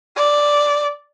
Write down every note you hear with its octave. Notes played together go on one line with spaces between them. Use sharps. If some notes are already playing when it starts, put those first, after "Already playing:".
D5